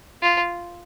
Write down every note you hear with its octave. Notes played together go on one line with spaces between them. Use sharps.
F4